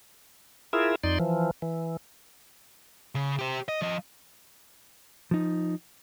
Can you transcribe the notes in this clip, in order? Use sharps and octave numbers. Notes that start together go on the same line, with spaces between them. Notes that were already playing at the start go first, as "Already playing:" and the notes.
E4 F4 G#4 A#4 E5
F2 D#4 D5 C6
E3 F3
E3
C#3
G4 C5
D#5
F3 D#5
F3 D#4